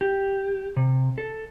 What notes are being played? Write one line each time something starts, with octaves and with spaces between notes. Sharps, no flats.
G4
C3
A4